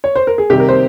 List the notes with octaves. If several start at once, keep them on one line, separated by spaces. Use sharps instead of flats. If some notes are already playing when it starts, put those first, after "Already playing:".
C#5
C5
A#4
G#4
C3 D#3 G3 G4
A#4
C5